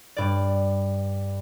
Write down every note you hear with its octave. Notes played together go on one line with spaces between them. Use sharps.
G2 D5